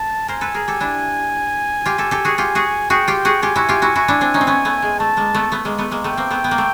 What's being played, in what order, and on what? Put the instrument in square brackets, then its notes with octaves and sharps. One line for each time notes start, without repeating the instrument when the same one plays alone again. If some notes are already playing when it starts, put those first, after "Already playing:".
Already playing: [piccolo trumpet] A5
[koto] A#4 C5 [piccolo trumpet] G#5
[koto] A4 B4
G#4 A#4
G4 A4
D4 E4
F4 G4
G4 A4
G4 A4
F#4 G#4
[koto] F4 G4 [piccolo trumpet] G#5
[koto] F#4 G#4
[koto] F#4 G#4 [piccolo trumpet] G5
[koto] F4 G4
F#4 G#4
[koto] F4 G4 [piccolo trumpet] G#5
[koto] E4 F#4
F4 G4
E4 F#4
E4 F#4
D4 E4
C4 D4
C#4 D#4
C4
B3 C#4
A3 B3
G#3
[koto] A3 [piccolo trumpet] A5
[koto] G#3 A#3
A3 B3
A3 B3
G#3 A#3
A3 B3
G#3 A#3
[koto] A3 B3 [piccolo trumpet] G5
[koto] A#3 C4
A3 B3
B3
A#3
A3